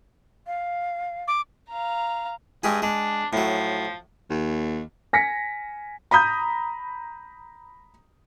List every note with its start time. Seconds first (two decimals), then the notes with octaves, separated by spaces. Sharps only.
0.47 F5
1.28 D6
1.70 F5 A#5
2.64 G2 G#3 G4 G#4
2.82 G#3 D4
3.33 A2 F3 F#3
4.30 D#2
5.13 G#5 A#6 B6 C#7
6.11 A#5 B5 D#6 G6